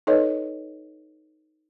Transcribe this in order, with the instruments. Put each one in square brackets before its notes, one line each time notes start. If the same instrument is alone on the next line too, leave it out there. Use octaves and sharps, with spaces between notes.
[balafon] D#4 A4 B4 C#5 D#5